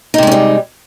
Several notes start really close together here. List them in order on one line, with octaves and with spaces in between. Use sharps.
D#4 C3 G#3 C#4 G3